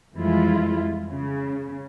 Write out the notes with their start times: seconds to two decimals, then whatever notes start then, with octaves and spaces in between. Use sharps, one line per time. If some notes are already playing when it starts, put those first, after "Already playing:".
0.15 F2 E3 G3 G#3 E4 F4
1.10 C#3